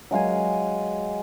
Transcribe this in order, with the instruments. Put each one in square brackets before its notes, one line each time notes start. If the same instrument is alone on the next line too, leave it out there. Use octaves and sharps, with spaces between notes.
[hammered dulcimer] F#3 G#3 F5 G#5